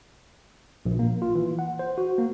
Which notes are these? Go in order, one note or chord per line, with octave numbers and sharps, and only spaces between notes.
A#1
A#3
F4
E3
F#5
C5
F#4
A#3